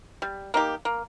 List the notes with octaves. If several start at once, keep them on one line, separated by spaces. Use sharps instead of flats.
G3
A#3 D#4 G4
A#3